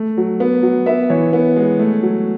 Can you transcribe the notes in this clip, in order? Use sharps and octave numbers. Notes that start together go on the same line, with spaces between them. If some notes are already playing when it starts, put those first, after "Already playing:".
Already playing: A3
F#3
B3
F#3
B3 E5
E3 C#5
B3
G#3
A3
F#3